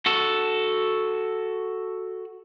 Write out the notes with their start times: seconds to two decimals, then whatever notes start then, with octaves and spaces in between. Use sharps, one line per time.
0.06 F#4 A4